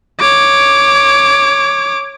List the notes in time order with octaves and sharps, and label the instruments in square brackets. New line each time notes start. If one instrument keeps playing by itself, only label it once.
[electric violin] C#5 D6